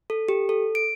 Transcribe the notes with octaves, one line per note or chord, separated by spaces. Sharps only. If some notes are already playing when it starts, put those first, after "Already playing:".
A4
G4
A4
D7